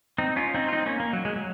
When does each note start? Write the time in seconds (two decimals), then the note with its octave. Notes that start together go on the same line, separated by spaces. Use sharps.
0.18 C4 D#4
0.36 C#4 F4
0.54 C4 D#4
0.68 F4
0.73 C4 D#4
0.86 A#3 C#4
1.00 A#3
1.13 F#3
1.25 G#3
1.36 F#3